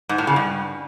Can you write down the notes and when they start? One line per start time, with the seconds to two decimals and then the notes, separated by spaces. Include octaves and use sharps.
0.09 G#2
0.18 A2
0.27 C#3
0.36 G2